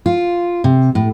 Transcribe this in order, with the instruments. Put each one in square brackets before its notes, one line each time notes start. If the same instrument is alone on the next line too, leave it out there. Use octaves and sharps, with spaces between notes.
[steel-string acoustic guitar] F4
C3
A2